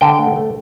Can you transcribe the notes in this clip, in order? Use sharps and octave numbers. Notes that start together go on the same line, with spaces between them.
D3 G5
A3
A3